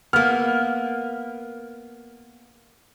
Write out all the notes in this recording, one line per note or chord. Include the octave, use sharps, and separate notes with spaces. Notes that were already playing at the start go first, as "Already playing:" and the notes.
A#3 B3 F6